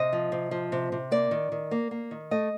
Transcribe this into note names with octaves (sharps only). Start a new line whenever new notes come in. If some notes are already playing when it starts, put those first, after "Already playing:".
Already playing: C3 D#5
F3
C3
F3
C3
C3
A#3 D5
D#3
D#3
A#3
A#3
D#3
A3 D#5